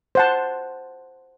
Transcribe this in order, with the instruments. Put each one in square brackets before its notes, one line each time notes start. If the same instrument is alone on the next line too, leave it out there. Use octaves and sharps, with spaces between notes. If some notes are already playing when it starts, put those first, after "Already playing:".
[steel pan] C5 F#5 A5